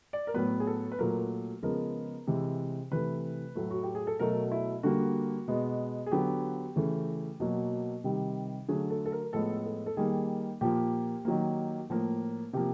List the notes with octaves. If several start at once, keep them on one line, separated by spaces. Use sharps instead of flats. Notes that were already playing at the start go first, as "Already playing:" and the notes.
D5
A#4
A2 F#3 B3 B4
G#4
A4
B4
A#2 F#3 A3 A#4
C#3 F3 G#3 B3 A#4
C3 E3 G#3
C3 E3 A3 B4
A2 F#3 A3
F#4
G4
G#4
A4
B2 F#3 A3 A#4
E4
D3 G3 A#3 F#4
B2 G#3 B3
G#4
D3 F#3 B3 G4
C#3 E3 A3
B2 F#3 A#3
C3 D#3 G3
D3 F#3 A3 G#4
A4
A4
A#4
A2 F3 G#3 B3 A4
A4
A4
D#3 G3 A#3 G#4
A#2 F3 A#3 G4
D#3 F#3 A#3
A2 F3 A#3
C3 F3 A#3 G4